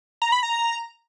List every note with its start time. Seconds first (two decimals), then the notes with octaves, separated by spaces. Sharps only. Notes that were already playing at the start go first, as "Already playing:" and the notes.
0.22 A#5
0.32 B5
0.43 A#5